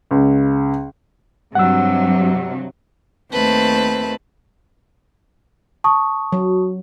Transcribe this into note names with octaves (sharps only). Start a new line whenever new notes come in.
C#2
G2 C3 F#3 F#5 E6
D#2 A3 C4 B4 A5
A5 C#6 D#6
F#3